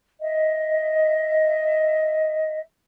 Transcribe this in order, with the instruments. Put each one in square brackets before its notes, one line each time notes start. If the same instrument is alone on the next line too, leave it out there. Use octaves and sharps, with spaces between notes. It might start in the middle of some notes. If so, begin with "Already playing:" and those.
[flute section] D#5 E5